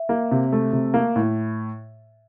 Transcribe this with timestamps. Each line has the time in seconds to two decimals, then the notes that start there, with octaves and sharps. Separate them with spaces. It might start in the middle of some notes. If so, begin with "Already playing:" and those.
Already playing: E5
0.09 A#3
0.31 C3
0.52 A3
0.73 C3
0.94 A#3
1.16 A2